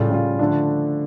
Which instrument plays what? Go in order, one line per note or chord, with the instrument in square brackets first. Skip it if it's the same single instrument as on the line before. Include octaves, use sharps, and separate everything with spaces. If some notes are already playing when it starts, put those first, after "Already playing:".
Already playing: [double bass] A2 [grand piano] C#3 G3 C#4 F4
[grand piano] C#3 G3 C#4 F4
D3 F3 A3 D4